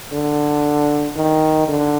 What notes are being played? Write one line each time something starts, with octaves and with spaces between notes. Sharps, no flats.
D3
D#3
D3